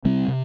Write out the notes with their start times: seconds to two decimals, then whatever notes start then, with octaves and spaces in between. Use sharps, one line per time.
0.05 C3 G3 C4
0.28 C3